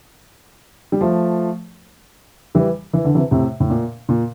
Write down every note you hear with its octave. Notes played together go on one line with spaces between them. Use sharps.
G3
F3 A3
E3 G3
E3
D3
C3 E3
A2 C3
A2
A#2
A#2